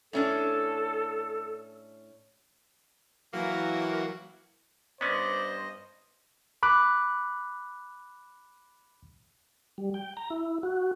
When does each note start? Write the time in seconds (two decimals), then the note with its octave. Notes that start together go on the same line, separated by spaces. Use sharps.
0.13 A2 C#4 D4 A4
3.33 E3 F#3 A#3
5.01 G2 B3 C#4 C5 D5 D#5
6.63 B5 D6 F#6
9.78 G3
9.94 G5
10.17 A#5
10.30 E4
10.63 F#4